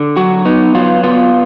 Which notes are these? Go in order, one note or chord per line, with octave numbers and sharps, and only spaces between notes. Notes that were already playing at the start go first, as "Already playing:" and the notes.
Already playing: D3
F#3 F#4
B3 D#4
F#3 F4
B3 F4